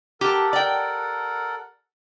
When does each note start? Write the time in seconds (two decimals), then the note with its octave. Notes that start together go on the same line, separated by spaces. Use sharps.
0.21 G4 A4 A#4 F#5 A5
0.53 D5 G5